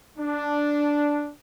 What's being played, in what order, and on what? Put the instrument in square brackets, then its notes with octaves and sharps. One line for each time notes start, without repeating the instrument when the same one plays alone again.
[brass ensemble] D4